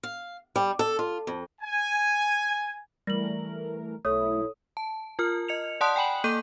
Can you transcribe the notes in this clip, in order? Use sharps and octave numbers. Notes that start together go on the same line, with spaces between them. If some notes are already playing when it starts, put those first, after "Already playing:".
F5
G3
A4
F4
F2
G#5
E3 G3 A3 A#4 A#6 F#7
B1 A3 E4 A4 C#5 D#6
A5
F4 A#4 F6
D#5 C#7 F7
D5 F#5 A5 C6 D#6 F#6
G5 G#5 B5 F#7
A#3 A4 D6 G6 D#7